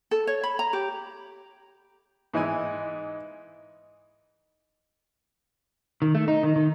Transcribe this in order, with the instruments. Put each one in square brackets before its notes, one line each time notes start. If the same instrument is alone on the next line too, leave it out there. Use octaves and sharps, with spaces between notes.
[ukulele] A4
C#5
B5
A#5
G4
[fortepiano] G#2 E3 D#4 E4 G#5
[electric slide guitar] D#3
A3
D#4
D#3
D#3